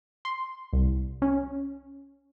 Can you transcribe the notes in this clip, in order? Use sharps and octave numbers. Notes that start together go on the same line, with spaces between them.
C6
C2
C#4